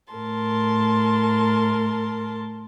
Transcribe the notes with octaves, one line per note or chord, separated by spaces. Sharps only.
A2 A#4 A5 C6